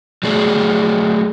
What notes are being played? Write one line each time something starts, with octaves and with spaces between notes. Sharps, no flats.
F#3 A3 G#4 D5